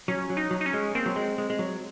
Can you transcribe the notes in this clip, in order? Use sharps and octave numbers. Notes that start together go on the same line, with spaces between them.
F#3 C#4
F#3
D#4
F#3
D#4
C#4
G#3
A#3 C4
F#3
G#3
G#3
G#3
F#3